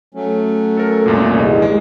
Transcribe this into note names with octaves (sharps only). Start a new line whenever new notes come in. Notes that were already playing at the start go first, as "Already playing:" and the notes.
F#3 A3 C#4
A4 A#4
C2 F#2 A#2
E2 G2 D#3
G#3